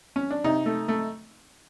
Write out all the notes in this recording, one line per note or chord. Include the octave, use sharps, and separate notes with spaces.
C#4
D4
C3 D#4
A3
A3